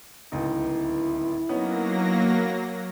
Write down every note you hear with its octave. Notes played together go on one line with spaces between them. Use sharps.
D1 C#2 D#4 E4
F#3 A#3 B3 C#4 D#4 A#6